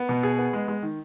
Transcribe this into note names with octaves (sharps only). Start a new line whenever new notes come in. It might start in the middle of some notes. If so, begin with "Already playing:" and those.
Already playing: B3
B2
G#4
B3
G#3
G#3
D#3